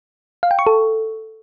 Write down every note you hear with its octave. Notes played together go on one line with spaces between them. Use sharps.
F5
G5
C#6
A4